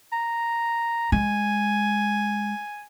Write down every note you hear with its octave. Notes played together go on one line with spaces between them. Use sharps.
A#5
G#3 G#5